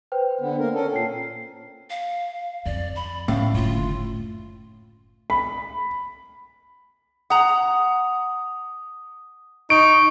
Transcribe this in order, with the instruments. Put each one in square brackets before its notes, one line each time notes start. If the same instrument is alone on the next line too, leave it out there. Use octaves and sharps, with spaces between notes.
[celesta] B4 C5 G5
[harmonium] D3 B3
A#3 A#4
C#4 A4 A#4
[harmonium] A#2 [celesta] G5 C7
[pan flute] F5
[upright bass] F2 [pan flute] D5
[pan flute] B5
[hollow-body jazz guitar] A2 [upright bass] C#4 [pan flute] F5
[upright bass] F#1 D2 [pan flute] F4
[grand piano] B5
[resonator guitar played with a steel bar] F#5 A#5 [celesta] D#6
[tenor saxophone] D#4 [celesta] C#6 [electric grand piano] D7